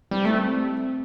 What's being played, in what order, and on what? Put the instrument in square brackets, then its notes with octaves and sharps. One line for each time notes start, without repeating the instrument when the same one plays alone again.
[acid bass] G3 [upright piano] C4
[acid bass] A3 [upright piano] C4